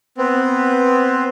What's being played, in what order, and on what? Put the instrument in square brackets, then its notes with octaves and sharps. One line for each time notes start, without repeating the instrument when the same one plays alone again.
[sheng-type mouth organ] B3 C4